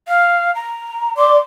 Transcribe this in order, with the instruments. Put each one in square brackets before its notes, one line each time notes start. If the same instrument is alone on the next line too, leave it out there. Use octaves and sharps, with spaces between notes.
[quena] F5
A#5
[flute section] D5 D6 [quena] C6